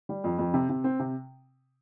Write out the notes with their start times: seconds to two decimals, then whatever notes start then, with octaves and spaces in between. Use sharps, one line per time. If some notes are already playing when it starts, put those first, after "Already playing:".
0.09 G3
0.24 F2
0.39 F2
0.54 C3
0.69 C3
0.84 C4
0.99 C3